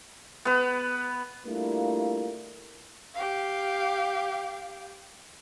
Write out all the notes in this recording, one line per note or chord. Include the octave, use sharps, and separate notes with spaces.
B3 B4
G3 A3 A#3 D4 E4 F4
G4 F5